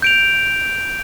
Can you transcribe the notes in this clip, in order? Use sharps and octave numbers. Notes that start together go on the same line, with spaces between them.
G6 D7 F7